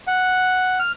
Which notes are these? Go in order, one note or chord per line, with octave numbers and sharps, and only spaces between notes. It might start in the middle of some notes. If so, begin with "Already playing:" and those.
F#5
F6